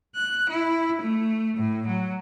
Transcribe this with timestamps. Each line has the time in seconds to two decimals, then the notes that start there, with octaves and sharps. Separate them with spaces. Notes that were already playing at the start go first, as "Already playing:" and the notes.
0.16 F#6
0.51 E4
1.02 A3
1.58 A2
1.88 F#3